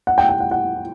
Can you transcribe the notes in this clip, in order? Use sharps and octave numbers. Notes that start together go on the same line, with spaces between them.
F#5
G5
G5
F#5
F#5